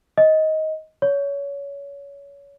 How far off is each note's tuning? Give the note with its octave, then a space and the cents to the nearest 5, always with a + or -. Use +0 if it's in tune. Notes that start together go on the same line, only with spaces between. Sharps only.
D#5 +15
C#5 +25